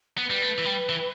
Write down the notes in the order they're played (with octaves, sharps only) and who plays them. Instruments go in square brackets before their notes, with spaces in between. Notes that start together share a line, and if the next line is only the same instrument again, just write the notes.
[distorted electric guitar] B3 [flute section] B4
[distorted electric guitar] G3
A3
E3
G3
E3